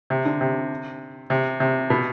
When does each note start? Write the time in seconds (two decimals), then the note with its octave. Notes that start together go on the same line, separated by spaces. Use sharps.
0.10 C3
0.25 D3
0.41 C3
1.30 C3
1.60 C3
1.90 B2